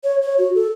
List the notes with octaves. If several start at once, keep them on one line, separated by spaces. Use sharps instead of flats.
C#5
C#5
F#4
A4